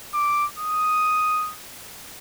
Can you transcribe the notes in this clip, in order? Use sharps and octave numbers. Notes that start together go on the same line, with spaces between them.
D6
D#6